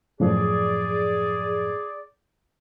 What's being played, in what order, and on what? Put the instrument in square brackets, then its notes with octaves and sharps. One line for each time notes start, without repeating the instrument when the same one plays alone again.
[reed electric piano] F#2 A2 F3 [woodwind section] G#4 D5